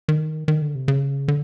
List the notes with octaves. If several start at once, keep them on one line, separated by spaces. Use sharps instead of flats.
D#3
D#3
D3
C3
C#3
D3